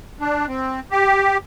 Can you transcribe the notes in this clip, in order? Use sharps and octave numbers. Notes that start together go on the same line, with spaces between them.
D4
C4
G4